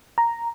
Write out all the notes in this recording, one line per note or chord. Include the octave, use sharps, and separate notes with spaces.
A#5